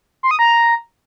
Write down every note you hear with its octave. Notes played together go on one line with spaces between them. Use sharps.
C6
D#6
A#5